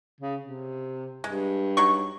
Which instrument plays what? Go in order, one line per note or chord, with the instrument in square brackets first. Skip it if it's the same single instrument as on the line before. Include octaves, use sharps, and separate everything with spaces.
[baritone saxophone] C#3
C3
[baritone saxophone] G2 [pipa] G#3
[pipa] F#3 D#4 C#6